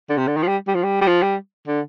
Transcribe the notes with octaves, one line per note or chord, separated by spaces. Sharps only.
D3
C3
D3
D#3
F3
G3
G3
F3
G3
G3
F3
G3
D3